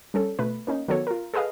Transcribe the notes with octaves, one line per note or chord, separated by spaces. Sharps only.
G3 C#4 A4
B2 A3 B4
A#3 C#4 D#4
D#3 F#3 B3 A4 C#5
F4 A#4
G#4 A4 B4 D#5 F5